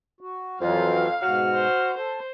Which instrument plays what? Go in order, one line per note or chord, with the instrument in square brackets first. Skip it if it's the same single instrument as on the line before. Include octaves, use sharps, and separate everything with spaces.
[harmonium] F#4
[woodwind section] F2 [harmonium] E3 F#3 F4 [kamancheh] F5
[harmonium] G#2 B2 [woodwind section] F#4 F6
[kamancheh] C5
[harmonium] A4 [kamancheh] C5